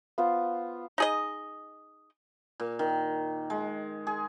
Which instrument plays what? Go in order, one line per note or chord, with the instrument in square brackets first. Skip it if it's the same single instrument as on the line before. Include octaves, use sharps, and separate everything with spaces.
[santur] B3 F4 C5
[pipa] D#4 G#4 D#5
[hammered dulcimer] A#2
D#3
G#3
G#4